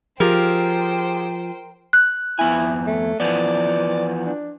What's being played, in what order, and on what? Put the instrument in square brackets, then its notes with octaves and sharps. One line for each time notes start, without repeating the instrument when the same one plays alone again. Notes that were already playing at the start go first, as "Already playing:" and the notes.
[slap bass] F3 [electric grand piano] F4 G4 G#4 [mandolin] A#4 [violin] C5 G5
[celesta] F#6
[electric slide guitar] F2 B3 G#5 [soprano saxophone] E4
[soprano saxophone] A3
[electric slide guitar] E3 F3 B3 [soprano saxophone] D5
[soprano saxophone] D4